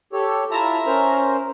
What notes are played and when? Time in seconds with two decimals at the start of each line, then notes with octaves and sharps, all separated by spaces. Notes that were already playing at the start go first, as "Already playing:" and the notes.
0.13 G4 A4 C#5
0.51 E4 F4 E5 A5 A#5
0.86 C#4 A#4 C5